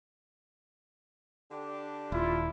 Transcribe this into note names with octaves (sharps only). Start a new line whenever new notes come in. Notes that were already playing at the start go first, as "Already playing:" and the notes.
D3 D4 G4
D#1 E4 F4